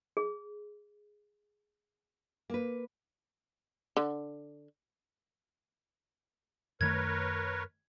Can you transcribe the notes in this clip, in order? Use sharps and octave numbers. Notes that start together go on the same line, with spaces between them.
G#4
A#3 B4
D3
F#2 D#3 A3 A#4 B4 C#5 G#6